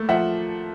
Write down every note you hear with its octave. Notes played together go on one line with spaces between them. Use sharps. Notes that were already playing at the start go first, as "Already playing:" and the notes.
Already playing: A3 A#3
F3 E5 F#5